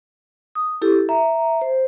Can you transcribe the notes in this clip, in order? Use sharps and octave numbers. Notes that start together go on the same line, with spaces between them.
D#6
E4 G4 A4
E5 A#5
C5